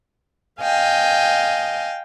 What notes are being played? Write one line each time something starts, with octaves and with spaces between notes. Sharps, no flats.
D#5 F5 G5 G#5